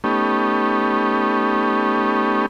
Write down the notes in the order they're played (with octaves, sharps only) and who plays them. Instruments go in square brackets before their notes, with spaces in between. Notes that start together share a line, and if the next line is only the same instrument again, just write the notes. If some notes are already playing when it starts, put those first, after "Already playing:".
[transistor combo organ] A3 B3 C#4 D#4 G4